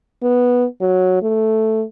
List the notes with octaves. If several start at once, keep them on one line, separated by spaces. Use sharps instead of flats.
B3
F#3
A3